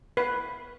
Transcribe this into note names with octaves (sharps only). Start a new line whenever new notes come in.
B4